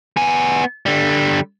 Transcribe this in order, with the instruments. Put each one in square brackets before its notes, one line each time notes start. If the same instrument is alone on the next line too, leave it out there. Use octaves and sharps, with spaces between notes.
[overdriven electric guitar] B3 G#5
D3 G3